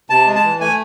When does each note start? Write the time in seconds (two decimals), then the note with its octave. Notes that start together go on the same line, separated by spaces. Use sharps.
0.10 C3 A5
0.26 G#3
0.35 A5
0.44 E3
0.60 A3 G#5